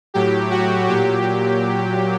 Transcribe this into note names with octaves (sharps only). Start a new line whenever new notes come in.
A2 F#3 G4
F#4
A#2 F#3 G4